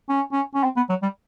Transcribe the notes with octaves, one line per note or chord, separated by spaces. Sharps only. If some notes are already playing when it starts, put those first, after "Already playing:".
C#4
C#4
C#4
C4
B3
F#3
G3